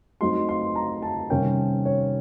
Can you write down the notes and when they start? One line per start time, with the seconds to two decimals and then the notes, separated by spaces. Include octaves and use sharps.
0.21 F#3 A3 C4 D#4 C6
0.49 C6
0.75 A#5
1.02 A5
1.30 C3 D#3 G3 A#3 C#4 G5
1.85 C#5